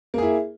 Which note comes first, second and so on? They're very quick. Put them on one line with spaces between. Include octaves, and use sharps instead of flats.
A#3 G#4 E4